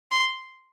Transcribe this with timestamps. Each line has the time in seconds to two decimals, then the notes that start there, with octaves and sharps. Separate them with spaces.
0.11 C6